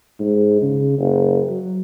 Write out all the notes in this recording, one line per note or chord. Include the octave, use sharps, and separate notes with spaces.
G#2
C#3
F#1
F#3